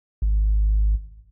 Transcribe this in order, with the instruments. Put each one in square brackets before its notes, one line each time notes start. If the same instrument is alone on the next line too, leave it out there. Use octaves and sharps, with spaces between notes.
[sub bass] G#1